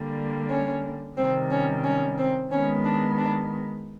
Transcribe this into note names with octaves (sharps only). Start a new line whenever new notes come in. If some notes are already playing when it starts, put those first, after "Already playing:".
Already playing: D3 G3 A#3
C#4
C3 D#3 G3 C4
C#4
C#4
C4
D#3 G#3 B3 C#4
D4
D4